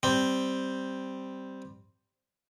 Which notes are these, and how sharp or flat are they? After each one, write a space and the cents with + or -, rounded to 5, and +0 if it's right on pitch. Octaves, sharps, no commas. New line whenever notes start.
G3 +0 C4 +0